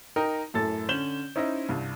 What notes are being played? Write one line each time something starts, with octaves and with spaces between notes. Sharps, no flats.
D#4 A#4 G5
F#2 A2 A4 A6
D3 C#4 G6 E7 F#7 G7
C#4 D#4 E4 C5 D#5
C2 G2